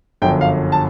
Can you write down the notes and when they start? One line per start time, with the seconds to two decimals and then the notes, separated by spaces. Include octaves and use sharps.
0.22 G1 F#2 D3 F3 G5
0.41 F5
0.72 A5